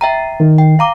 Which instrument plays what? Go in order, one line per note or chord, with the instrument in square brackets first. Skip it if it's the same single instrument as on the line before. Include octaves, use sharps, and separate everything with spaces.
[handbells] E5 G5 A#5
[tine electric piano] D#3
[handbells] G5
F5 A#5 D6